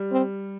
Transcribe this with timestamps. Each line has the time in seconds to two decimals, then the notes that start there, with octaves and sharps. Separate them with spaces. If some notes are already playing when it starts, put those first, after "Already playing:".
Already playing: G3
0.12 C4